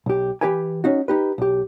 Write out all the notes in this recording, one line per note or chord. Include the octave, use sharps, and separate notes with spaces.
B1 G4
E3 G#3 G4 B4 G5 G#5
C#4 D#4 F#4
D#4 G4 B4
B1 G4